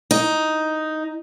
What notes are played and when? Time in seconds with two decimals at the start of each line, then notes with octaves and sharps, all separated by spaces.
0.11 D#4